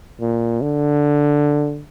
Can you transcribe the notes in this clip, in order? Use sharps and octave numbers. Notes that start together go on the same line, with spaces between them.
A#2
D3